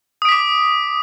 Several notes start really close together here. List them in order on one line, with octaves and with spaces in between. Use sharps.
D#6 D7 B6 D6